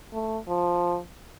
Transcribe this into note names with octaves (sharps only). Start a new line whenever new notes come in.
A3
F3